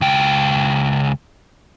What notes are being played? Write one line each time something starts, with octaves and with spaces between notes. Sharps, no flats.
C#2 G5